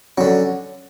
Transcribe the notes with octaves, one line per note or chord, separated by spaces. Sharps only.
D3 F#3 C#4